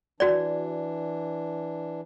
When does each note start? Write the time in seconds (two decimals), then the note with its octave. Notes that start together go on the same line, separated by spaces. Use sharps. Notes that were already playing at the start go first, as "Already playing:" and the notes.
0.20 E3 D4 F#4 D5